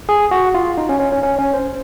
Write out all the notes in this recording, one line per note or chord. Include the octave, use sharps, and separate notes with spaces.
G#4
F#4
F4
D#4
C#4
C#4
C#4
C#4
C#4
C5